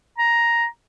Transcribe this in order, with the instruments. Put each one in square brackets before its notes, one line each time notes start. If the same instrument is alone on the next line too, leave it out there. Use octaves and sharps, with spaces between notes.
[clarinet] A#5